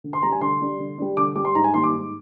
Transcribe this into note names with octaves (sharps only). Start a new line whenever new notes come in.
D3
C6
G3 D4 A#5
G#5
D3 C6
G3 D4
D3
G3 D4
D3 D6
G3 D4 D6
C6
G#2 A#5
G#5
D#3 G3 A#3 C6
D6
G#2